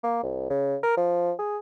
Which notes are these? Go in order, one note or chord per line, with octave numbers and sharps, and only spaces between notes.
A#3
C2
C#3
A#4
F3
G#4